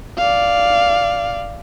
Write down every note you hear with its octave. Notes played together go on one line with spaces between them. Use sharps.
D5 F5